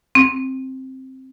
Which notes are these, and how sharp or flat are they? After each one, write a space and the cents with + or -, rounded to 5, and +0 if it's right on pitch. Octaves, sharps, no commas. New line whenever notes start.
C4 +5